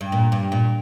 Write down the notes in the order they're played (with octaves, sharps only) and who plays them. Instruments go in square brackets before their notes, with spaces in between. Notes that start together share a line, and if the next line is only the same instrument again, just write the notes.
[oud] G2
A#2
G2
A#2